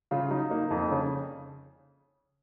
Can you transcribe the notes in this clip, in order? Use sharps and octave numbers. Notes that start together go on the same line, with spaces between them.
C#3 F4
F#3 D#4
A#3 D#4
F2 D#4
C#3 C#4